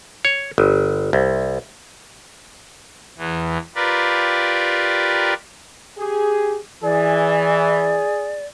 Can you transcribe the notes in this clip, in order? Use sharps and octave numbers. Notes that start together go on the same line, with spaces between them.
C#5
G1
C2
E2 E3
F4 G4 A#4 B4 D5
G4 G#4
E3 G#4 D5